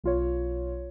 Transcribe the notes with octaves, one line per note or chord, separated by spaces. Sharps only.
B1 F4 C#5